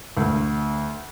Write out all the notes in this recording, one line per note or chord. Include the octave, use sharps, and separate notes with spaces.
D2